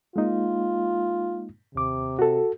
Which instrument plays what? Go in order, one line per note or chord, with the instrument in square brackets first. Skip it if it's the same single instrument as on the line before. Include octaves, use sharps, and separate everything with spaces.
[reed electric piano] G#3 A#3 D#4 [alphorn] F4
[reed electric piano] D#2 D6 [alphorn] C3
[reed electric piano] F#4 A4